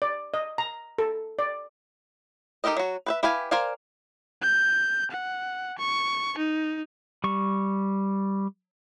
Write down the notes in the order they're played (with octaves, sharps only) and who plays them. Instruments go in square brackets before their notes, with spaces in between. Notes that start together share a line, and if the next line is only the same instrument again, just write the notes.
[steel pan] D5
D#5
A#5
A4
D5
[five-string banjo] D#4 G4 A4 A#4 D#5
F#3 F#4
B4 C5 E5
E4 G4 B4 F5 G#5
A#4 C5 D5 F5 G#5
[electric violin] G6
F#5
C#6
D#4
[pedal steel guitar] G3 C#6